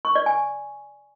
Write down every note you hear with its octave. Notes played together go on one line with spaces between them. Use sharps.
C#6
D5
G#5